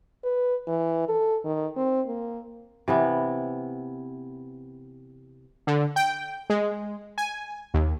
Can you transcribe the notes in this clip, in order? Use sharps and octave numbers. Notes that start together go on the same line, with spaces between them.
B4
E3
A4
D#3
C4
A#3
C3 E3 B3
D3
G5
G#3
G#5
D#2